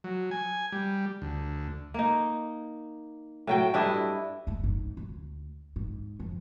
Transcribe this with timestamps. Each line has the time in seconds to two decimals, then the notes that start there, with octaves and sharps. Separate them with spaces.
0.04 F#3
0.31 G#5
0.72 G3
1.22 D2
1.94 A#3 D#4
3.47 A2 F#3 G5
3.74 G2 D4 E4 D#5
4.47 F#1 D2
4.64 G#2
4.97 D2
5.76 G#2
6.20 F2